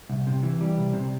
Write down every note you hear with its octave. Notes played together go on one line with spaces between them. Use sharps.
C2
C3
E3
G3
C2
C3